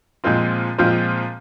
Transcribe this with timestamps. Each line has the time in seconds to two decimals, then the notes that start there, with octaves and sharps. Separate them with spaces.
0.24 A#2 F3 G#3 C4 F4
0.78 A#2 F3 G#3 C4 F4